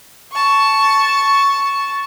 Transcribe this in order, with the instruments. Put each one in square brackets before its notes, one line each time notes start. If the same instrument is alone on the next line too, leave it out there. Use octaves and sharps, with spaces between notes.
[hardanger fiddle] A5 C#6